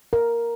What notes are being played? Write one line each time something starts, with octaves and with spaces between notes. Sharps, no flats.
A#4